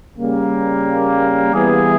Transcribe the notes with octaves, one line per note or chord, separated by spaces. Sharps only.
C#3 G3 A#3
E3 G3 B3 E4 G#4